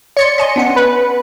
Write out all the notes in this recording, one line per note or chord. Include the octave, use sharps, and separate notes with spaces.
C#5 D5 C6 C#7
D#5 G#5 C6
B3 C#4 F#5
B4